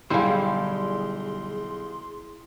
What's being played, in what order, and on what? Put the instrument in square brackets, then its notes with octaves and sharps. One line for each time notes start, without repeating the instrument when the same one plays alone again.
[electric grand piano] B1 [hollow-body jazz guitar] D3 G3 [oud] E4 F5 [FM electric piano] G#4 C6